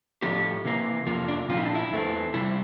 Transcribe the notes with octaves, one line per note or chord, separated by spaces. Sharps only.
A2 F3 A3 C4 G4
C3 E3 A#3
F2 C3 F3 A#3
D4
A#2 F3 C4 F4
E4
D4
E4
E2 E3 A3 C4
C3 G3 C4 E4